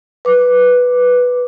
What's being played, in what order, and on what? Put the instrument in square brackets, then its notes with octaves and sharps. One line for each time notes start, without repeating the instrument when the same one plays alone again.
[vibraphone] B4 D6